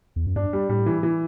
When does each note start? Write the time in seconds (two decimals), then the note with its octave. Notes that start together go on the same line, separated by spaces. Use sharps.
0.16 E2
0.27 F#2
0.36 G2 D4
0.53 G3
0.69 A2 G3
0.86 E3
1.03 E3